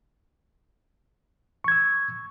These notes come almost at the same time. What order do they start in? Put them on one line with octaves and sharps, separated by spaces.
C#6 G#6 E6